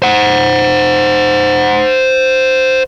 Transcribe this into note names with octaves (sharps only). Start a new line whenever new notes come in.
C5 F#5